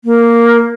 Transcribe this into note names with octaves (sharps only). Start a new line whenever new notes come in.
A#3